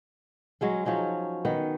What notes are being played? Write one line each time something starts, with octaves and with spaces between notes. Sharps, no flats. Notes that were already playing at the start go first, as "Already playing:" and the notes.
F#3 G#3 C#4
F3 F#3 C#4 D#4
D#3 B3